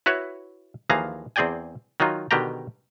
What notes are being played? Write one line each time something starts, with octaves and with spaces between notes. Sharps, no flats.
E4 F#4 B4 C#5 E5
D#2 E3 F3 G#4 F5 A#5
E2 C4 G#4 D5 G5 G#5
D#3 F#3 D#4 F4
B2 D3 D#3 G4 G5 A#5